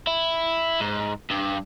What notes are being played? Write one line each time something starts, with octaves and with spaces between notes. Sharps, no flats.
E4
G#2
G2